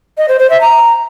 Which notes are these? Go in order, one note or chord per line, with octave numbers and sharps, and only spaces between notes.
D#5
C5
C5
E5
A#5